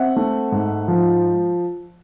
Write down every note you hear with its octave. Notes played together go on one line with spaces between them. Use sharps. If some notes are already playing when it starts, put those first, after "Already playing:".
Already playing: C4 E5 F#5
A3
G#2
F3